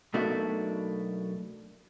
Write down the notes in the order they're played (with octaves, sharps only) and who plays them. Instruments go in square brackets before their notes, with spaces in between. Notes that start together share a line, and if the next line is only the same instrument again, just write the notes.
[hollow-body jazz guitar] B1 B2 A3 A#3 D4 F#4